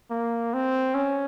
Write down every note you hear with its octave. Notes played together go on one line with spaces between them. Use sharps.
A#3
C4
C#4